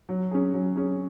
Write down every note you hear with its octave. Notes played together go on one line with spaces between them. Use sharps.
F#3
C#4 G#4
F#3
C#4 G#4